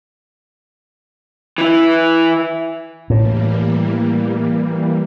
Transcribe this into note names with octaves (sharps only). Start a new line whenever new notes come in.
E3 E4
A2 E3 G3 A#3